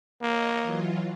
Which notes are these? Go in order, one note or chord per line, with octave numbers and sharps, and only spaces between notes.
A#3 C#5 D#5
E3 F#3 F4